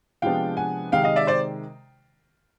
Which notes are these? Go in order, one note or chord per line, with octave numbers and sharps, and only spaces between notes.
C3 F3 G#3 B3 D4 F5 G5
F#5 G#5
C3 D#3 G#3 F5 G5
D#5 F5
D5 E5
C5 D5